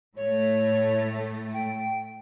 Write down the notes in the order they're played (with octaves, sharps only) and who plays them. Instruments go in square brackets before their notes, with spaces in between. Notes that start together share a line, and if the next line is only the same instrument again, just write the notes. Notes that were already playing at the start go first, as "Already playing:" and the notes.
[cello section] A2 A3 [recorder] C#5
[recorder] G5